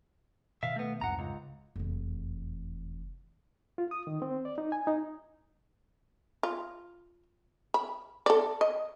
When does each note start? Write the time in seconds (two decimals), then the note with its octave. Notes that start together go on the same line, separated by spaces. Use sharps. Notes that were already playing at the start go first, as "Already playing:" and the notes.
0.63 B2 D#3 E5 F5
0.76 A3 B3
1.01 C2 F2 G#2 F#5 A#5
1.19 C#2
1.76 F1 E2
3.78 F4
3.91 D#6
4.07 D#3
4.22 C4
4.45 D5
4.58 D#4
4.72 G#5
4.87 D#4
6.43 F4
7.74 B5
8.26 A4 D5
8.61 D#5